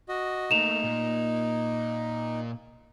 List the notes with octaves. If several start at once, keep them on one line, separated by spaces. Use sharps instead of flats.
F#4 D#5
A3 A#3 D#4 E7 F7
A#2 A#3